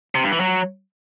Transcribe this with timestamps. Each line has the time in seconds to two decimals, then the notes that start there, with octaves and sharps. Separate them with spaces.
0.15 C3
0.23 G2
0.32 E3
0.40 F#3